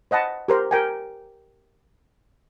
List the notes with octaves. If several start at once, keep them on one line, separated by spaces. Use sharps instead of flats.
C5 D#5 F#5 A5 B5
G4 A#4 C5
G4 A#4 G5 G#5